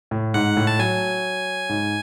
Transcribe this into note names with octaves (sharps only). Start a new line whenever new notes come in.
A2
G#2 F#5
A2
A5
F#3 G#5
G#2